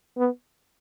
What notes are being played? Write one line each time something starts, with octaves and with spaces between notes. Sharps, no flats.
B3